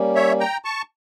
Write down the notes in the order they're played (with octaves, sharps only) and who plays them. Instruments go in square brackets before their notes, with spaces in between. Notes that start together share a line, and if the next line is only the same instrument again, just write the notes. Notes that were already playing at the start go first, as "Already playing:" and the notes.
Already playing: [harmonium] G3 A#3 C#4
[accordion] C#5 E5
G5 A#5
A5 C#6